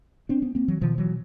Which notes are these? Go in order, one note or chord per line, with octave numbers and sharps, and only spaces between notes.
C4 D4
B3 C#4
A#3 C4
E3 F#3
B2 D#3 F3
E3 F#3